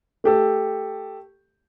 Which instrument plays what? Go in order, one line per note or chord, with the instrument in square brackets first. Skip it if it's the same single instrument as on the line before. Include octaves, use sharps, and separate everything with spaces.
[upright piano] A3 G4 A4